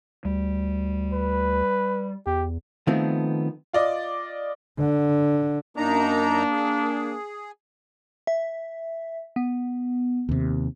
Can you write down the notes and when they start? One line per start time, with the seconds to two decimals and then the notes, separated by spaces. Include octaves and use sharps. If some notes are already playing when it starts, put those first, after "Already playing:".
0.25 D2 G3
1.13 B4
2.26 E2 G4
2.87 D#3 F3 A3 B3 C4
3.73 F4 D5 D#5
4.79 D3
5.77 F#2 A#3 D4 D#4 A#5
6.51 G#4
8.27 E5
9.36 B3
10.29 D#2 C3